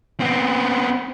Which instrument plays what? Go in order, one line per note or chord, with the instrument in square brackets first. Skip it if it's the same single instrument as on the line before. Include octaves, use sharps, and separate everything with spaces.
[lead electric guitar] B3 C4